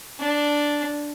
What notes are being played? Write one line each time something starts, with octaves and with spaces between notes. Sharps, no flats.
D4